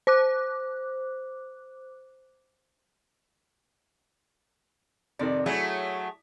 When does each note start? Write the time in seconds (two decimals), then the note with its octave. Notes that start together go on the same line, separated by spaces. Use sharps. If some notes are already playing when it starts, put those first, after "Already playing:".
0.07 C5 D6 F#6
5.19 F2 C3 D#3 D5
5.46 F#3 A3 E4 G#4